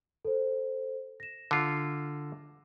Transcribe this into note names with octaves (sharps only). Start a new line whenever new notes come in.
A4 C5
A#6 E7
D3 F4